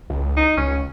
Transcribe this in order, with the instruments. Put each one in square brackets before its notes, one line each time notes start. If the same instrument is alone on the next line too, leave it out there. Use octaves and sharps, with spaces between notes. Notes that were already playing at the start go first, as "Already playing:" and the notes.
[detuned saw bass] C#2
[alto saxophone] D#4
[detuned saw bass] C#2 [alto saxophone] C#4